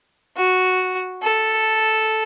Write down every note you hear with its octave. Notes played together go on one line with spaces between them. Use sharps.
F#4
A4